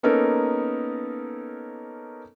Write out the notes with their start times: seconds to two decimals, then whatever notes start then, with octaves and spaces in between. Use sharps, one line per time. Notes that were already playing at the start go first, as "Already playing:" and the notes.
0.03 A#3 B3 C#4 D#4 A4 A#4